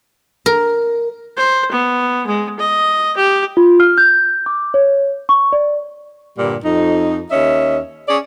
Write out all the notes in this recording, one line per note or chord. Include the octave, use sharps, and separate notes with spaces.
A#4
C5
B3
G#3
D#5
G4
F4
F6
G6
D6
C#5
C#6
D5
G2 A#2 D3 G3
F2 D#4
D#2 C#4 D#5 E5
C#4 G#4 C#5 D5